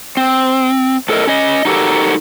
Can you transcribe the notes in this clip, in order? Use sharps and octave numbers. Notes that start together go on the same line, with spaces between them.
C4
A2 A4 A#4 D#5
C#4 D#5
D#4 F#4 G4 A4 A#4